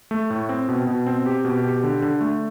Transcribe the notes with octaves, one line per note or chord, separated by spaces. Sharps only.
A3
A2
C4
B2
B2
C4
G4
B2
G4
D3
D3
A3